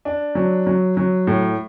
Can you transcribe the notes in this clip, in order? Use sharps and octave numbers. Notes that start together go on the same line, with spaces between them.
D4
F#3
F#3
F#3
A2